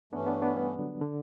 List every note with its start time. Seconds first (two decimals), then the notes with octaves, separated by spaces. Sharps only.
0.13 G2 E3 A3 B3 C#4 D4
0.27 B3 D4
0.42 B3 D4
0.56 G3 B3
0.79 D3 F#3
1.01 D3